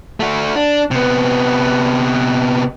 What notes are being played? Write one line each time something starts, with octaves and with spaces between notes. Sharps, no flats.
A3 F#4
D4
C3 B3